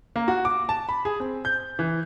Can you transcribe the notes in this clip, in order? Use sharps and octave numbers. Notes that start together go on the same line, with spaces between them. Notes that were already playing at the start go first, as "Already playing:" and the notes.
A#3
F#4
D6
A5
B5
G#4
C4
G6
E3